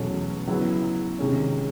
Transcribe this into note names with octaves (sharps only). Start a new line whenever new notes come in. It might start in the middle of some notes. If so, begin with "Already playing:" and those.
Already playing: E2 B2 F#3 A3 C#4
C#3 F#3 B3 E4
C3 D#3 G#3 C#4